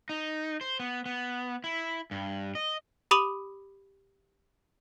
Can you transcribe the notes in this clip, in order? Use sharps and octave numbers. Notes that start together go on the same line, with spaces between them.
D#4
C5
B3
B3
E4
G2
D#5
G4 B5 D6 D#6 D#7 F#7